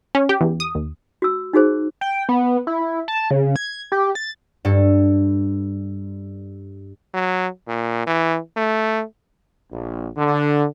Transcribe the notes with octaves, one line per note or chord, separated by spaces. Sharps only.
C#4
G4
E2
D#6
D#2
F#4 E6
D#4 F#4 G#4 C5
G5
B3
E4
A5
C#3
G#6
G4
A6
G2 A4
F#3
A#2
E3
A3
A#1
D3